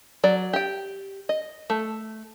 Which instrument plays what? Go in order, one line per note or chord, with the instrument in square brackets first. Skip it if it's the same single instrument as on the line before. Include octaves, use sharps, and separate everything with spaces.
[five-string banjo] F#3 D5
G4 G5
D#5
A3